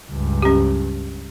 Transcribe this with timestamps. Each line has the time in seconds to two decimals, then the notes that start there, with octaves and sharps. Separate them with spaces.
0.11 C#2 G2
0.42 C#4 G4